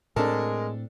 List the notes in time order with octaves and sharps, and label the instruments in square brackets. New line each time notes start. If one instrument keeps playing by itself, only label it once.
[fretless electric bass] A2 C4 [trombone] G#3 [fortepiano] D4 A4 [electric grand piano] A#4